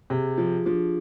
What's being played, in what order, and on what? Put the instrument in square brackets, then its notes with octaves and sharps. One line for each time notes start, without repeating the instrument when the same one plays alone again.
[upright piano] C3 [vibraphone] G#4
[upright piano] F3 [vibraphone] G4
[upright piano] F3 [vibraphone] D4